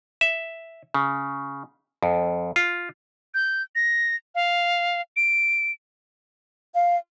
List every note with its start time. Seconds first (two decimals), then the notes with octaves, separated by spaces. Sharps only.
0.21 E5
0.94 C#3
2.03 F2
2.56 F4
3.34 G6
3.75 A#6
4.35 F5
5.17 D7
6.75 F5